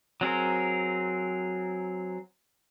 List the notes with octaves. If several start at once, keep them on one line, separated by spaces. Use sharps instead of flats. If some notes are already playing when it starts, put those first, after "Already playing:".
F#3 C4 G#4 A#4